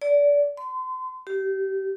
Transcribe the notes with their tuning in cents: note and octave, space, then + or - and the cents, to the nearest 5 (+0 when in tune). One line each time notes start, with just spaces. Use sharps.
D5 -25
C6 -35
G4 -25